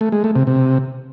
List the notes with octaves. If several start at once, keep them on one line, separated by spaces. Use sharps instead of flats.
A3
G#3
A3
C3
C3